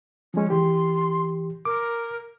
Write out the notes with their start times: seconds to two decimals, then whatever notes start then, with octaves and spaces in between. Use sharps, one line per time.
0.34 F3 G#3 C#4
0.50 E3 G4 C6
1.65 A#4 D6